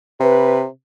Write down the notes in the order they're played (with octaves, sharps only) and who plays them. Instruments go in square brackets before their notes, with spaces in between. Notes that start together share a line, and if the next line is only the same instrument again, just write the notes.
[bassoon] C3 [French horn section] B4